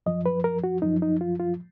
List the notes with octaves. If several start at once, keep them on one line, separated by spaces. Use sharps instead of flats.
F#2 F3 D#5
B4
A#4
F#4
F#2 F3 D#4
D#4
F4
F4